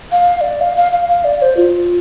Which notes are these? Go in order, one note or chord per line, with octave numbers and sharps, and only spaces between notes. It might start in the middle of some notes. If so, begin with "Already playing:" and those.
F5
F5
D5
F5
F5
F5
F5
D5
C5
F4